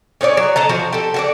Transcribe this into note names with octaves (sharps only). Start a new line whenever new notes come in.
C#4 D#4 C#5 D5
F#3
A4 D#5 A#5
F3 F#4
G4 A4
F#4 A4 D5